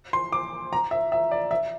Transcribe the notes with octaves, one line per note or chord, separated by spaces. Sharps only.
C6
D6
A#5
E5
E5
D5
E5